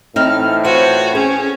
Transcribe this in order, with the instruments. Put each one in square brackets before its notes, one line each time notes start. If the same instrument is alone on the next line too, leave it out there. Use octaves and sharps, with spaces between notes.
[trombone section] A2 E3 [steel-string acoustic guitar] C4 D#4 [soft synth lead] F6
[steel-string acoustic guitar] B3 F4 [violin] F#4 C#5 [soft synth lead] C5
[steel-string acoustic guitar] C4 [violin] C#4 [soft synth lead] G#4